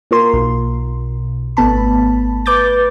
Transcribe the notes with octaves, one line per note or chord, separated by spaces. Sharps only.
A#3 F4 A#4 C6
B1
G#1 A3 B3 A5 B5
B4 D6 G6 A6